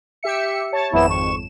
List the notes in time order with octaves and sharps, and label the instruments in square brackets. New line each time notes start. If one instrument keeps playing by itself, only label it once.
[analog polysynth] G4 E5 C#7
C#5 A5
[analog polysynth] G#1 F2 E7 [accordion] B3 E4
[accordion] C#6